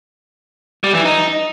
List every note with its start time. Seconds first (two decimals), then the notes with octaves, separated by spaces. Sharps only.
0.84 G3
0.94 E3
1.05 D#4